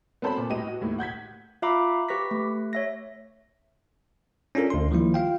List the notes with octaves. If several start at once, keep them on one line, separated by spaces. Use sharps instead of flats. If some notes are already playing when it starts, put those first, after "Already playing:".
B3 C4 A4 C5 A5 B5
A#2
A2 G4 B4 D#5 D#7
F#4
D#2 A2 A3 A#3
F#5 G6 G#6 B6
F4 E5 F5 A#5 B5 D6
G4 B4 C#6 A#6 B6
A3
C#5 E5 A#6
C#4 D4 F4 A4 A#4
D2 C6
D#3 F3 G3 A#3 E4
F4 F5 G5